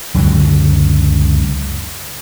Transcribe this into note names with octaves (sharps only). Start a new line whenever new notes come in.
C#2 F#2 D3 F#3